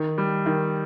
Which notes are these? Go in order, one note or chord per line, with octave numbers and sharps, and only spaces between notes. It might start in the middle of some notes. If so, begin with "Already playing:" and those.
Already playing: D#3
G3
D#3